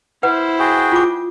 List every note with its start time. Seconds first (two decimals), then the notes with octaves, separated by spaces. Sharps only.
0.23 E4 B4 C5 F#5
0.59 F#4 G#4 G5
0.92 F4 D6